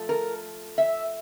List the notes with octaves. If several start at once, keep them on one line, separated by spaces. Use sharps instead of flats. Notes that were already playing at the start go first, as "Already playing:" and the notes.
Already playing: F3 A3
A#4
E5